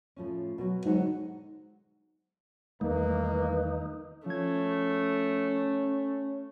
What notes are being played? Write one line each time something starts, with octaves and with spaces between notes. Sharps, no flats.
A2 F3 C#4
B2 F#3
G#2 D3 F#3 F#5
E2 D#3 G3 A3 A#3 D#4 B4
F3 A3 C#4 G#6